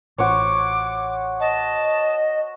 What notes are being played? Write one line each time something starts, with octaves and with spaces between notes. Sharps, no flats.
A1 F#4 C5 C#5 D6
D#5 A5